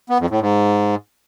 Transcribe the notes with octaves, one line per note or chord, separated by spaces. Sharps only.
B3
F2
A2
G#2